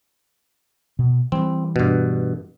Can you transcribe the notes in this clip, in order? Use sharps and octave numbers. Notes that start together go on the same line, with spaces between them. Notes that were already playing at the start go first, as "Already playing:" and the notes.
B2
E3 G3 C4
G2 B2